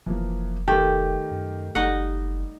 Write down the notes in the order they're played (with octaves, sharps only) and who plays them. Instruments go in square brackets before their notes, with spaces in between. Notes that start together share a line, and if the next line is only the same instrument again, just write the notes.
[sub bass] F1 [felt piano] E3 F3 A#3
[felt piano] D#3 G3 A#4 [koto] A3 [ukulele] G4
[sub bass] F#2
[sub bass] F#1 [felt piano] G3 [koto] D#4 D#5 F#5